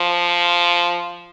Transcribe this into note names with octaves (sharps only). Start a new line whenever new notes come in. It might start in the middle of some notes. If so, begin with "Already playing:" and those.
Already playing: F3